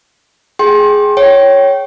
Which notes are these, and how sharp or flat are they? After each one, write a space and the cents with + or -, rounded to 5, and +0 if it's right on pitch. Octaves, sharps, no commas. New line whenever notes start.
G#4 +0 G5 -5 C6 +30
C#5 +0 G5 -20